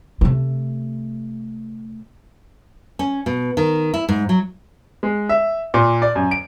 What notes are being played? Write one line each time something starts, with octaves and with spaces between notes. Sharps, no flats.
C3 A3
C#4
B2
D#3
E4
G#2
F#3
G#3
E5
A#2
D5
F#2
D7